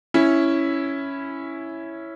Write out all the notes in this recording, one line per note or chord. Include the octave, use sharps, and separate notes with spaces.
C#4 E4